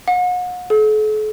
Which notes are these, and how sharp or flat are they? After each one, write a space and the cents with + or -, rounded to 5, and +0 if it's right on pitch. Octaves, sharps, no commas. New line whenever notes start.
F#5 -40
A4 -45